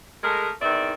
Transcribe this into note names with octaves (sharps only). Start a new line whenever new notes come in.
G#3 A3 G#4 A#4
E2 D#3 C4 E4 D5 E5